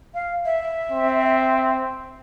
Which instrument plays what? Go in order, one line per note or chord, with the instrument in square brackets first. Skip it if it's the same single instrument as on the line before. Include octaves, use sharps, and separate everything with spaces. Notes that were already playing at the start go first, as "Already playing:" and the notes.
[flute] F5
E5
[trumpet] C4